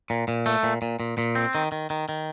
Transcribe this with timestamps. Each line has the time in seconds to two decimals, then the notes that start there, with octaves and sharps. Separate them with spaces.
0.10 A#2
0.28 A#2
0.46 A3
0.63 A#2
0.82 A#2
1.00 A#2
1.18 A#2
1.35 C4
1.55 D#3
1.72 D#3
1.90 D#3
2.09 D#3